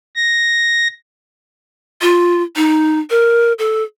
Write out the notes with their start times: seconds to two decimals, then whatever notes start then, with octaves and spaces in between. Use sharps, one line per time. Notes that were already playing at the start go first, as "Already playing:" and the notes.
0.16 A#6
2.01 F4
2.56 D#4
3.10 A#4
3.59 A4